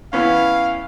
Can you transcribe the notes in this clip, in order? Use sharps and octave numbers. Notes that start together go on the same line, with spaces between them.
E3 B3 C#4 F5